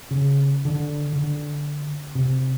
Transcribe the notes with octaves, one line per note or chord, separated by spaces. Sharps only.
C#3
D3
D3
C3